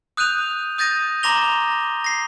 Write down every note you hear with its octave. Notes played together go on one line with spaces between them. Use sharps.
D#6 F#6 G6 D#7 F7
D#6 G6 A6 A#6 D#7
A#5 C6 D6 A#6 F7 G7
A#6 C7